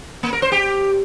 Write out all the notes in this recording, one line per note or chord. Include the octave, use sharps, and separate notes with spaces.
A#3
A#4
C5
G4